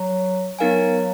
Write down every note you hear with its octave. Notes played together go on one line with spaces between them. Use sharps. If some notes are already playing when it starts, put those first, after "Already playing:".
Already playing: F#3
F#3 B3 D#4 A#4 F5 G#5